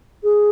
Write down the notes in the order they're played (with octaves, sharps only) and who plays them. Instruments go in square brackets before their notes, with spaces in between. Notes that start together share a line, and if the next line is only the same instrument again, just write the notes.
[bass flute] G#4